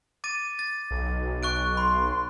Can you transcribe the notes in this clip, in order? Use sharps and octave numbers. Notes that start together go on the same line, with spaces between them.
D6 A6 D#7
A6
B1
C#6 F#6 D7
B5 C6